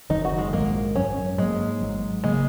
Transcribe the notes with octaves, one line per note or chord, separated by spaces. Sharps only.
F#1 F#2 D#3 F#3 D#4
F#4
G#3
A#1 G#2 G#3 A#3
G#1 F#2 F#3 C#4
G#2 F#3 G#3 A#3
G#1 G#2 F#3
C#3 G#3 A#3